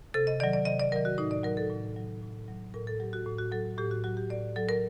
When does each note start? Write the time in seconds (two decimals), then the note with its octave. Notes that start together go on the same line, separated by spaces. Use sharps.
0.14 C3 A4
0.27 D#5
0.40 D#3 F#3 D5
0.53 D5
0.65 C3 D#5
0.80 D5
0.92 D#3 F#3 A#4
1.05 F#4
1.18 A2 D#4
1.31 D5
1.44 F#3 A#4
1.57 A4
1.70 A2
1.96 F#3
2.22 A2
2.48 F#3
2.74 A2 A#4
2.87 A4
3.00 F#3 G4
3.13 F#4
3.26 A2
3.39 F#4
3.52 F#3 A4
3.78 A2 G4
3.91 F#4
4.04 F#3 F#4
4.17 G4
4.30 A2 D5
4.56 F#3 A4
4.69 A#4